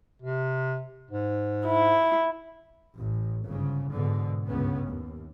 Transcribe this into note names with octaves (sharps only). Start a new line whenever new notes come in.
C3
G#2
E4
A1
G1 G#2 C#3
G#2 B2 D3
C#2 G2 B3 C#4
D#2